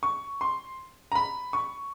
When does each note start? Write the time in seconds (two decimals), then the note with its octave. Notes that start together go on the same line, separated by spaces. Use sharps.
0.03 C#6
0.41 C6
1.12 A#5
1.15 B5
1.53 C#6